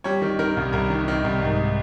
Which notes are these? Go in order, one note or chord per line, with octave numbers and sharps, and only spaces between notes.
G3 C#5
D#3
D#3 A#4
C2
C2 A#4
D#3
D#3
C2
G#2